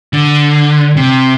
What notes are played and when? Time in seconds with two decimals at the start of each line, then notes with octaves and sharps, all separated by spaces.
0.13 D3
0.96 C3